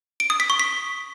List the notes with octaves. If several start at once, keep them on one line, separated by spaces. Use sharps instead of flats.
D7
D#6
B6
C#6
B6